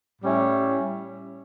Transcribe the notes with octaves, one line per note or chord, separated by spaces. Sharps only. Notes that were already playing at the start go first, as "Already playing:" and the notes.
A2 G3 C#4 E4